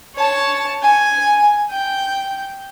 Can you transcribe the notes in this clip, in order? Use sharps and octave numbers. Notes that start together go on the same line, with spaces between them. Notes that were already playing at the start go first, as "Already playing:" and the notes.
C#5 A5
G#5
G5